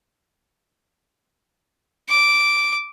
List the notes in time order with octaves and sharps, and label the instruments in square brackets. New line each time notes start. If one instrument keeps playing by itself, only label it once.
[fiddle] D6